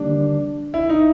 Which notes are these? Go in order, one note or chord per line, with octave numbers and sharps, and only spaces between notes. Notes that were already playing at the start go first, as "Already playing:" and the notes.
Already playing: D#2 D3 G3 A#3 D4
E4
D#4